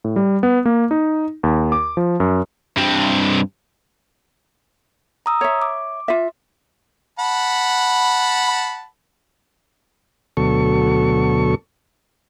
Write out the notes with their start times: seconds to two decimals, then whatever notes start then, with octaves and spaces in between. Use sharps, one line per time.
0.04 A2
0.16 G3
0.43 B3
0.66 A#3
0.91 D#4
1.43 D#2
1.72 D6
1.97 F3
2.20 F#2
2.77 G2 C4
5.26 A#5 D#6 E6
5.41 C#5 E5
5.62 D6
6.08 F4 E5
7.19 F#5 A5 B5
10.37 D2 B2 F#3 A4 C#6